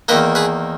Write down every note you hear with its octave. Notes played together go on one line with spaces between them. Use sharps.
E2 D#3 A#3 B4 D#5
G#4 B4